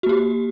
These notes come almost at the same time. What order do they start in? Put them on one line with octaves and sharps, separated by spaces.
F#4 A#3 G4